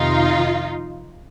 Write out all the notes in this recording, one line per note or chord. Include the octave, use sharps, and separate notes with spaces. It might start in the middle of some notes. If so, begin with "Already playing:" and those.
Already playing: F2 C3 D#3 D#4 F4